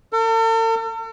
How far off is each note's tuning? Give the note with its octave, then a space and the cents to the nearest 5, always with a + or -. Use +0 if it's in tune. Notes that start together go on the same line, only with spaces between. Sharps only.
A4 +45